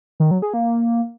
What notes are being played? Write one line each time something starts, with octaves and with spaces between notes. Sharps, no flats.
D#3
F#3
G#4
A#3